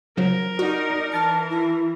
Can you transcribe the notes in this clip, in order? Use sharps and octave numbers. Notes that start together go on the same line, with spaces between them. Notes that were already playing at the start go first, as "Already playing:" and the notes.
C#3 F3 F#3 A#4
D#4 F#4 D5
E3 A5 F6 A6 C#7
E4